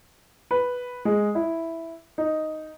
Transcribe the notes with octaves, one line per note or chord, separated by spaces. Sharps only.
B4
G#3
E4
D#4